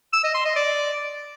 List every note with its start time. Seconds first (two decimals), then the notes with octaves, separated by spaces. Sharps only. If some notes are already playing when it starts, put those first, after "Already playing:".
0.13 E6
0.24 D#5
0.34 C6
0.45 D#5
0.56 D5